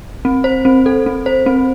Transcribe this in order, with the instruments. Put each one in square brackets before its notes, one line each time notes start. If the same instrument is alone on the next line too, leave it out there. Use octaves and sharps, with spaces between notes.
[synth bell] C4
C5
C4
A4
C4
C5
C4